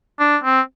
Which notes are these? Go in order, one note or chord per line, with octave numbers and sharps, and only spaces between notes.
D4
C4